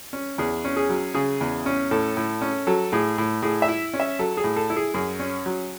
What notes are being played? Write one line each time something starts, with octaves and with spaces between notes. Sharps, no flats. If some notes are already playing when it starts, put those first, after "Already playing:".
C#4
E2 G#4
C#4
G#4
F#3
C#3 G#4
E2
C#4
A2 A4
A2
C#4
F#3 A4
A2 G#4
A2
A2 G#4
E5
E4
C#4
E5
F#3 A4
G#4
A2
A4
E4
G#4
F#2 G#4
C#4
F#3